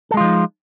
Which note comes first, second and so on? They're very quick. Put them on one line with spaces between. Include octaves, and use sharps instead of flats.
A4 G#3 F4 F3 D#4